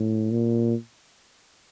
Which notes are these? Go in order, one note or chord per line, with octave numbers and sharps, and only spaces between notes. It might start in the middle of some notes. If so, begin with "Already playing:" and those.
Already playing: A2
A#2